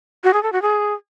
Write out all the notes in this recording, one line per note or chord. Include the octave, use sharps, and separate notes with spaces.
F#4
G#4
A4
F#4
G#4